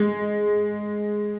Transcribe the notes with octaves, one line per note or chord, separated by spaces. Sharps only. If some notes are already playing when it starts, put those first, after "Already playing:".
Already playing: G#3